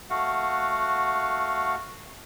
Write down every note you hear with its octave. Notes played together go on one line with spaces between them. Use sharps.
A3 F#4 F5 F#5